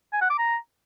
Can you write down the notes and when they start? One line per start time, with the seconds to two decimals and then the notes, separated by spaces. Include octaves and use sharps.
0.13 G#5
0.21 F#5
0.30 D6
0.38 A#5